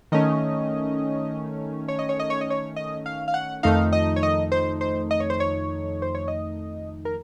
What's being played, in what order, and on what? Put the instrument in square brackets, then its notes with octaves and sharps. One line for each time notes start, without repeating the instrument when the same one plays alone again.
[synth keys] D#3 A3 C#4 D#5
C#5
D#5
C#5
D#5
C#5
D#5
C#5
D#5
F5
F5
F#5
F2 D#3 A3 D#4 F5
D#5
C#5
D#5
C5
C5
D#5
C#5
C5
C#5
C5
C#5
D#5
A#4